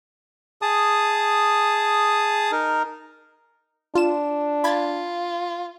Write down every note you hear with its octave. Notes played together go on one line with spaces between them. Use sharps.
G#4 A5 D#6
D#4 A#4
D4 F4 E7
F4 B5 G#6 A6